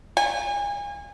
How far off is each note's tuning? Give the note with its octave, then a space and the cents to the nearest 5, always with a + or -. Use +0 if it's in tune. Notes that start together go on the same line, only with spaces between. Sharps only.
G#5 -35